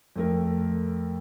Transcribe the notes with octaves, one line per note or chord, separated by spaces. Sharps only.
F2 A3 A#4